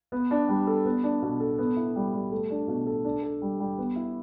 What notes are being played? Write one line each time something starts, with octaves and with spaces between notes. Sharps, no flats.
B3
D4
G3
A4
B3
D4
B2
A4
B3
E4
G3
G3
A3
D4
B2
A4
D4
A4
G3
G3
B3
E4